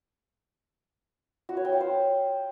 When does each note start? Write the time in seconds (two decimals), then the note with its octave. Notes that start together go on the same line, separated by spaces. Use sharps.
1.49 F#4
1.57 C#5
1.65 G5
1.73 F5
1.81 C5